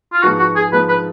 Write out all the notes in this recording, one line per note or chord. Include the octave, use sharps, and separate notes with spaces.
F4
G#2 F3 B3 D#4 F#4
F#4
G#4
G#2 F3 B3 D#4 B4
B4